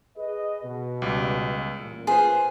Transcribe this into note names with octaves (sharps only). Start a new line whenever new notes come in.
G#4 B4 D#5
B2
C#2 G3
A1 F#2 A#2
F4 G#4 B4 C5